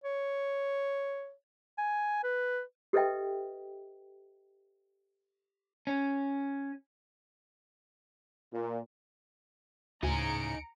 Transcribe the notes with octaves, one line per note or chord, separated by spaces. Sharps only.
C#5
G#5
B4
G4 A4 B4 D#5 E5 G5
C#4
A#2
D2 A2 C#3 D#4 G#5 A#5 C#7 D7